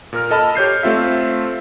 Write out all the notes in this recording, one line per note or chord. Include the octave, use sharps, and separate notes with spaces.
A#2 A#4 F6
A4 D#5 A5 B5 F6
G4 C#5 G6 C7
A3 C4 F4 E5